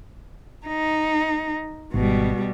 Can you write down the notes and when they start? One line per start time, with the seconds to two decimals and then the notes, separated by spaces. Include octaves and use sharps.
0.66 D#4
1.94 G#1 B2 G3